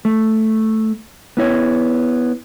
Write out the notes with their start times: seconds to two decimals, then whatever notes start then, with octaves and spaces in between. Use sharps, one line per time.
0.05 A3
1.37 B3 E4 C#5